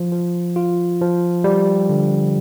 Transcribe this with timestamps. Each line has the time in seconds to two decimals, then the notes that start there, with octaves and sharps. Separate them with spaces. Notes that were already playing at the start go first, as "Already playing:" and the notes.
Already playing: F3
0.12 F3
0.56 F4
1.01 F3
1.44 G3
1.89 D3